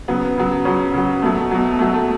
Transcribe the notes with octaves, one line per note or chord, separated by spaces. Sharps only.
C#3 F#3 B3
C#3 F#3
C#3 F#3 C#4
C#3 F#3
B2 F#3 A3
B2 F#3
B2 F#3 A3
A3